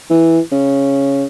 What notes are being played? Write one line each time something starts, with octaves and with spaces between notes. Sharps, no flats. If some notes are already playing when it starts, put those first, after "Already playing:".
E3
C#3